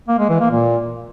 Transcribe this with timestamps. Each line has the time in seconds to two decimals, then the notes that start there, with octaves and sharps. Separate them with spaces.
0.08 A#3
0.19 G#3
0.29 E3
0.40 A#3
0.50 A#2